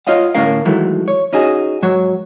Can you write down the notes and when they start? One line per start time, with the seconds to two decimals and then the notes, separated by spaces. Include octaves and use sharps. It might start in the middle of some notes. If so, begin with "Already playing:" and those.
0.07 F4 C#5 D#5 F5 F#5
0.35 D2 A2 C#4 A#4 F5
0.65 D#3 E3 F#3 G#3 A3
1.08 C#5
1.33 C#4 D#4 F#4 G#4
1.82 G#2 F#3 C#5